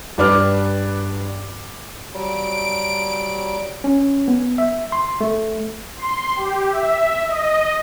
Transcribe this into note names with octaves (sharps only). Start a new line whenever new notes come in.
G2 G3 D4 B4 D6 F6
F#3 G3 D7
C#4
B3
E5
C6
A3
C6
G4
E5
D#5